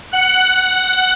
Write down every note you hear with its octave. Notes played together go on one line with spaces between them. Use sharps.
F#5 F#6